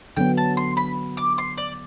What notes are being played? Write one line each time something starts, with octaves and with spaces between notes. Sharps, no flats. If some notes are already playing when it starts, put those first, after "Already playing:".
D3 F#3 B3 G5
A5
C6
B5
D6
C6
D5